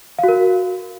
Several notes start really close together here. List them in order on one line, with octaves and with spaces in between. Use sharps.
F5 F#4 A#4